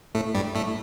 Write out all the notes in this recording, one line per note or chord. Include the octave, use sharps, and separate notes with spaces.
A2 A3
G2 G3
A2 A3